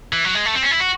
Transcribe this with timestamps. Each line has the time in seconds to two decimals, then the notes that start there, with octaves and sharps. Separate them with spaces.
0.13 E3
0.25 F#3
0.35 G#3
0.46 A3
0.55 C4
0.63 C#4
0.71 E4
0.80 F#4